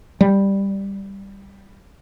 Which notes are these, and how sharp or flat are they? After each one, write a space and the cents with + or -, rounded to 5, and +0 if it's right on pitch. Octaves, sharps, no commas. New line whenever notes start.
G3 +5